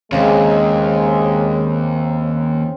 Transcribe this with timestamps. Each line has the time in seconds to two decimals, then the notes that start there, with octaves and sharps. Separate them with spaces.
0.12 D#2 C#3 G#3 C4